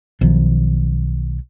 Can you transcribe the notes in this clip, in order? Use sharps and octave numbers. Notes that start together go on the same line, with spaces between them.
B1 D#3 F3